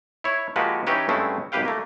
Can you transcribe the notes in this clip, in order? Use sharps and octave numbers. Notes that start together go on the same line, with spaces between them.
E4 C#5
F3 G#3 A#3 F#4 G4 B4
E3 C#4 D#4 G4 B4 C#5
G2 G#3 A3 C4 C#4 E4
G#1 F#2 G4 B4 F5 G5
A3 A#3